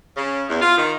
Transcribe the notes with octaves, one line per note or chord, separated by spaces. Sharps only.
C#3
E2
F4
D#3